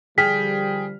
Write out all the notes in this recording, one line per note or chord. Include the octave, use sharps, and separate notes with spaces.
D3 F3 G3 G#4 G5 F6 B6